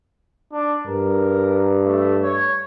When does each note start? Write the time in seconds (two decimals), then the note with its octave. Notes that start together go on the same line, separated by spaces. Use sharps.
0.52 D4
0.87 G2 A#4
1.86 A3
2.23 C#5